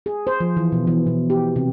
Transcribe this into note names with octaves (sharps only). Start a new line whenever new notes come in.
G#4
C5
F3
E3
B2
E3
B2
G4
C3